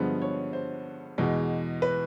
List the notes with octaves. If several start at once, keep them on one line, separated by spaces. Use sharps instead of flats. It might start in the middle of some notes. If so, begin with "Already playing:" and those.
Already playing: G2 D3 F3 G#3 B3
C#5
C5
E2 B2 G#3
B4